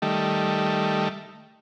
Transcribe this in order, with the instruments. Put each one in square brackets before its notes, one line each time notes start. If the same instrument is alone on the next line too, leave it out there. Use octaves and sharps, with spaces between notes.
[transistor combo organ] D#3 G3 A3